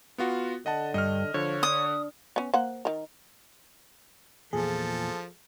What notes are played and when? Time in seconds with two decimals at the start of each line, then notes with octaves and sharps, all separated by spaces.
0.18 B3 F4 F#4
0.66 D3 D#5 F#5 A5
0.94 G2 D#5 F6
1.34 D3 F3 C#5
1.63 D4 D#6
2.36 B3 C#4
2.54 A#3 C5 F#5
2.85 D#3 A#4
4.53 E2 A#2 F3 G#4 A4